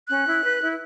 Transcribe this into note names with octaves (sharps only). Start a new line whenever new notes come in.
C#4 F#6
E4
B4
E4